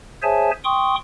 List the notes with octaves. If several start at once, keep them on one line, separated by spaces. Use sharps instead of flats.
G#4 C5 C#5 E5 G#5 A5
G5 C6 C#6 D#6